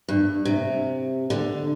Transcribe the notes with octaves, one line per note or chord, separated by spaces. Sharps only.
G2
C3
D3